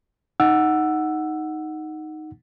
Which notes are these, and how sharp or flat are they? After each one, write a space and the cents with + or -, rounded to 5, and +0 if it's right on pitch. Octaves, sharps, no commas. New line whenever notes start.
D#4 +0 F#5 +0 E6 +5